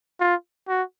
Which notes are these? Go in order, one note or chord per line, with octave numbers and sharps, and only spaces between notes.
F4
F#4